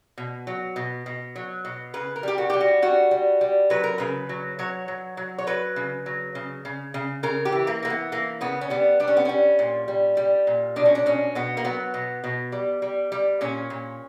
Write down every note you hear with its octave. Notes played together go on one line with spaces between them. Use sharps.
B2
F#3
B2
B2
F#3
B2
C#3 B4
A#4
G3 G4
F#4
G3 G4
F#4
G3 F#4
G3
G3
F#3 B4
A#4
C#3 B4
F#3
F#3 C#5
F#3
F#3
C#5
F#3 B4
C#3
F#3
C#3
C#3
C#3
C#3 A#4
G4
E3
A#3
E3 A#3
B3
E3 A#3
C#3 B3
C#4
G3 B3
G3 D4
C#4
B3
G3 C#4
A#2
G3
G3
A#2
B2 D4
C#4
D4
B2 C#4
B2 B3
A#3
F#3 B3
B2
B2
G3
G3
G3
A#2 C#4
A#2